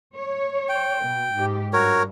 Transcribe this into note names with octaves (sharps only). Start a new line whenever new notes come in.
C#5
G5
B2
G#2 G4
G2 F#4 A#4 C#5